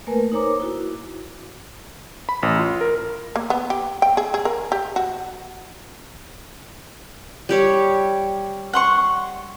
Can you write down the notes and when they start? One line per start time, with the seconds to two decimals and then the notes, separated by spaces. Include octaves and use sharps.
0.07 A3 A#3 A#4 B4 G#5
0.32 D#4 A#4 C5 C#5 A#5 D6
0.60 E4 F#4
2.29 B5
2.43 A1
2.59 F4
2.81 A#4
3.36 A#3
3.50 B3
3.70 G4
4.02 G5
4.17 G#4
4.34 G#4
4.45 A#4
4.72 G4
4.96 F#4
7.49 G3 G4 C#5
8.73 F#5 C6 C#6